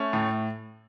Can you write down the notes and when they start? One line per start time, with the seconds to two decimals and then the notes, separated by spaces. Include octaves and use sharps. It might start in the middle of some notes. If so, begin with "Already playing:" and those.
Already playing: A3 C#4
0.13 A2